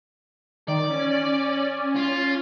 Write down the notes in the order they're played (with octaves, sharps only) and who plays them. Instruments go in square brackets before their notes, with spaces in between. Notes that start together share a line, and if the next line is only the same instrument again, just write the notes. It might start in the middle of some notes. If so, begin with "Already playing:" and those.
[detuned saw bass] D#3 [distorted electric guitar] D5
[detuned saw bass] C#4
[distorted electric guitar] F4